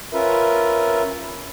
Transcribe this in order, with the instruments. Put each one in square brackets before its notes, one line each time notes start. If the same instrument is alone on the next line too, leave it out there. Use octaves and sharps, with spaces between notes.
[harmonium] C#4 F4 A#4 B4 E5